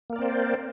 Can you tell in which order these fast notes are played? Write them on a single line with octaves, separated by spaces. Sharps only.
A#3 A#4 D5 C4 C5